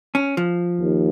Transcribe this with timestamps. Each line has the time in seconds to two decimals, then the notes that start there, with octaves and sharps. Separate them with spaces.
0.15 C#4
0.37 F3
0.81 D#2